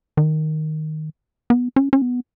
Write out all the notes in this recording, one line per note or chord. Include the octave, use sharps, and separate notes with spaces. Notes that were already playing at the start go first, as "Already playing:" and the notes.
D#3
B3
C#4
C#4
B3